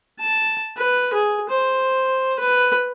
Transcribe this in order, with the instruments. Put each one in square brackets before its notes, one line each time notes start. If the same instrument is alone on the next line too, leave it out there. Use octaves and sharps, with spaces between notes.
[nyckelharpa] A5
B4
G#4
C5
B4